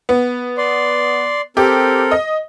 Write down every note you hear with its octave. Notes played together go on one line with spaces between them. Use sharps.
B3
D5 C6
C4 G4 A4 A#4
D#5